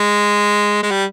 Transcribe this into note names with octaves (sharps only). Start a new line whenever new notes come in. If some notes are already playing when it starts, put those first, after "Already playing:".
Already playing: G#3
G#3
G3